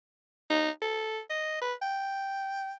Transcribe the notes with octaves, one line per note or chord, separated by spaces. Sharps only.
D#4
A4
D#5
B4
G5